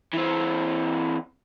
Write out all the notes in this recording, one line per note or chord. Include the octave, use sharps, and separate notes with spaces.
E3 C4